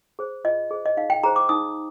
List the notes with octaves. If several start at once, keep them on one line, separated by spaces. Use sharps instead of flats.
G#4 C5
F4 D#5
G#4 C5
D#5
D#4 F5
G5
G#4 C5 A#5
D6
D#4 D#6